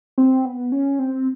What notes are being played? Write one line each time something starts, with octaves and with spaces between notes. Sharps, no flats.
C4
B3
C#4
C4